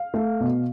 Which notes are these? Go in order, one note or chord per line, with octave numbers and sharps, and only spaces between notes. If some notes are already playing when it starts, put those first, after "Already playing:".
Already playing: F5
A3
B2